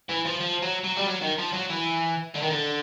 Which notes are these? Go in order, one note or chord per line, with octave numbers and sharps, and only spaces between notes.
E3
F3
F3
F#3
F#3
G3
F#3
D#3
F3
F#3
E3
D3
D#3
D3